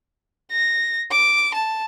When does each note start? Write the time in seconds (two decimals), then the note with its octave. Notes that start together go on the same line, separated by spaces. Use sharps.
0.51 A#6
1.11 D6
1.54 A5